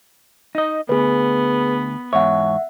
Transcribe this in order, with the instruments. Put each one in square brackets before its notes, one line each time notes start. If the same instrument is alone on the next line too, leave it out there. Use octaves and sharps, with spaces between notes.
[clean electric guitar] D#4 D#5
[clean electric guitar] D2 [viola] B3 [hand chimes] G#4 B4
[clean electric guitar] E2 G#2 C#5 [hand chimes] E5 F#5